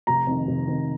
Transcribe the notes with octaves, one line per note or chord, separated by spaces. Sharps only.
F1 A#5
F2 D#3
F1
F2 D#3